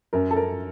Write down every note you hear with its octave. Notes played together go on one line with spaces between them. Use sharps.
F#2 A#4
A4
A#4